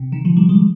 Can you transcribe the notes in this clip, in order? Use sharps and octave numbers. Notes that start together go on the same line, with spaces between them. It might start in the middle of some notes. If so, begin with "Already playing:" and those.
Already playing: C3
C3 D#3
D3 F3
D#3 G3
F3 G#3